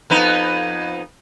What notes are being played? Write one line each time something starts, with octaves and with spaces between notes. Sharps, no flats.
F2 B3 D#4